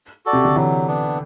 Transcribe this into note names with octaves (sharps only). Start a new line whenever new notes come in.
F#4 A4 D5
C3
D3
E3 F#3
B3 D4